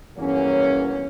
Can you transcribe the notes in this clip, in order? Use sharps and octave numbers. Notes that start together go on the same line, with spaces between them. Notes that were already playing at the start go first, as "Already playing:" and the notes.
E2 G2 E3 F#3 A#3 C#4